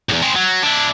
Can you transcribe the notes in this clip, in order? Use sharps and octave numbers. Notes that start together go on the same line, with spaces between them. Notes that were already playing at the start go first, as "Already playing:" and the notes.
B1 E2
G#3 C4
F#3
D4 E4